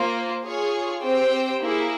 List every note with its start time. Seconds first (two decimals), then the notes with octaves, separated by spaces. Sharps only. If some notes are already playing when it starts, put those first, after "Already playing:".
Already playing: A#3 F4 C5
0.43 F4 G#4 C#5
1.02 C4 G4 C5 G5
1.61 A#3 E4 G#4